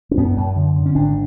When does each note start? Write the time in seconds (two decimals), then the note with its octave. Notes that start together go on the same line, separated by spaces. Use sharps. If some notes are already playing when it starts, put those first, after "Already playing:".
0.11 C#4
0.17 F#2 B3
0.37 F#2
0.56 D3
0.76 D3
0.86 C#4
0.95 G#1 D4